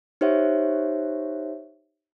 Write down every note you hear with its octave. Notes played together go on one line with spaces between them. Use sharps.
D#4 G4 C5 C#5 E5 F#5